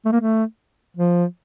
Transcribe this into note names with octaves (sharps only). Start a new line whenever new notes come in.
A3
A#3
A3
F3